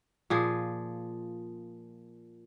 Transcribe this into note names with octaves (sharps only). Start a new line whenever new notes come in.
A#2 F3 G#4